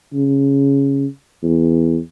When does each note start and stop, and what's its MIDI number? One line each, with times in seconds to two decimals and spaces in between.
0.14 1.06 49
1.43 1.98 40